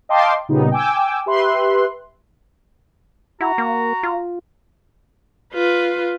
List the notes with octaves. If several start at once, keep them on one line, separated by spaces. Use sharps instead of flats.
D#5 F5 G5 A5 C6 D6
A#2 C#3 G3 B3 D#4
G5 G#5 D6 E6
G4 B4 E5 C6 F#6
E4 F#4 A#5
A#3
F4
F4 B4